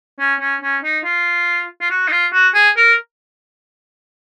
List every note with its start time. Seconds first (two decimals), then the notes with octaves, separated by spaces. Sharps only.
0.20 C#4
0.40 C#4
0.62 C#4
0.84 D#4
1.04 F4
1.81 F4
1.90 F#4
2.08 D#4
2.12 F4
2.33 F#4
2.54 G#4
2.77 A#4